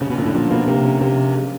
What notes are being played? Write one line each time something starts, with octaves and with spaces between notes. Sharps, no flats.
C#3 C#4
B2
A#2 D3
A2
A#2 F3
B2 A#3
C3 A#3
C#4
C3 A#3
C#4
G#3